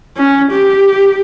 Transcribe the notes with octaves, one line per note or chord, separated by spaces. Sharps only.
C#4
G4